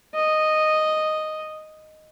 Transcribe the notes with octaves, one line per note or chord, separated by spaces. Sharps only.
D#5